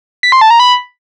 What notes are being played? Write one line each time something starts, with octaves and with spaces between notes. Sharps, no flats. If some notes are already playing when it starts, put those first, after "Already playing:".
B6
C6
A5
A#5
B5